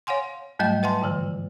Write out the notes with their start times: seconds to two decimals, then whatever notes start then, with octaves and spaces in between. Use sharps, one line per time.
0.07 C#5 F5 F#5 G#5 C6
0.59 G#2 F#3 G3 A3 D#5 G5
0.83 B4 E5 F#5 G#5 A5 C6
1.01 G2 D3 E3 F3